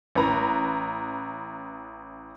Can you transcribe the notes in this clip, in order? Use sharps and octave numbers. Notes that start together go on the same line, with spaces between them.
A1 B4 A#5